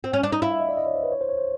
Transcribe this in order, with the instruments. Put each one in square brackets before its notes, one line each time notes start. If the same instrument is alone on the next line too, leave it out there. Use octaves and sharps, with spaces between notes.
[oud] C4
C#4
D4
D#4
[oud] E4 [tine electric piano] F5
[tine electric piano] E5
D#5
D5
D#5
C#5
C5
B4
C#5
C5
C#5
C5